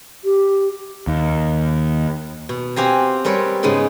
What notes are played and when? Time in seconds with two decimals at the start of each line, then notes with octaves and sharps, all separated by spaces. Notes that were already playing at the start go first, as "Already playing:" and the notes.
0.24 G4
1.07 D#2
2.49 B2
2.76 C4 F#4 G4 F5 G#5 A#5
3.25 G3 C4 A#4 B4 C#5
3.63 G#2 C#3 G#3 B3 D#4